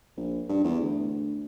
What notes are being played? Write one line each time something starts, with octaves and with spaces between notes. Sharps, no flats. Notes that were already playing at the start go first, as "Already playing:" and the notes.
A#1
G2
E2
D2